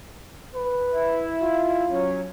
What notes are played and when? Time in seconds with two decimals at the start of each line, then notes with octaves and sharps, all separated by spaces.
0.55 B4
0.92 E4
1.42 F4
1.90 F#3 C#4